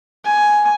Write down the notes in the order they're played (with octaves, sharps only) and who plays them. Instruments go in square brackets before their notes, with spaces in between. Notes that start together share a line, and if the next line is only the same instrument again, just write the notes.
[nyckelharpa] G#5